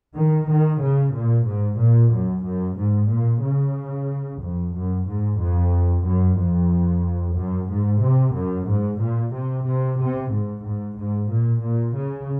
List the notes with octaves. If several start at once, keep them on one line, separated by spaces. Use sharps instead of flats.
D#3
D#3
C#3
A#2
G#2
A#2
F#2
F#2
G#2
A#2
C#3
F2
F#2
G#2
F2
F#2
F2
F#2
G#2
C3
F#2
G#2
A#2
C3
C3
C3
G#2
G#2
G#2
A#2
A#2
C#3